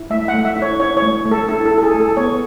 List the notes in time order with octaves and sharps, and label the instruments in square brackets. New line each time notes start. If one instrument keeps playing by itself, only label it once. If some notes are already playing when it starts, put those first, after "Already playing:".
Already playing: [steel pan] E4
A3 E5
F#5
A3
E5
E4
C#5
E4 C#5
C#5
A3
A3
A4
E4 A4
A4
E4
A4
G#4
A3
A4
B3 C#5